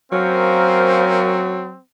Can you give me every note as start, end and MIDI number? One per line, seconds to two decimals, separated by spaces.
0.12 1.76 54
0.12 1.59 58
0.12 1.82 60
0.12 1.59 61
0.12 1.59 70
0.12 1.24 72
0.12 1.24 77